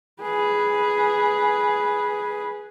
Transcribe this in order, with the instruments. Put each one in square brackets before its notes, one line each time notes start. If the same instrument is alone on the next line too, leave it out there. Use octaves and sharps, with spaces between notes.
[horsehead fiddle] G#4 B4